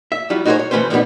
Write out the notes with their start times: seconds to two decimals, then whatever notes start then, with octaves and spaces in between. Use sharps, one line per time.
0.12 E5
0.30 F#3 G3 E4 F4
0.45 D#4 F#4 G#4 A#4 C5 C#5
0.59 C#5
0.71 E3 A3 A#3 C#4 B4 C5
0.90 F2 B2 G3 A3 B3 D#4